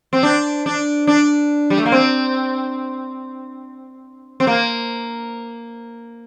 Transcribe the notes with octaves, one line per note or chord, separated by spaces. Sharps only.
C4
D4
D4
D4
G3
A3
A#3
C4
C4
A#3